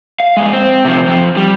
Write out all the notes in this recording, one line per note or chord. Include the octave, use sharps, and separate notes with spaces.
F5
F2 G#3
C4
C3 F3
F2 F3
G3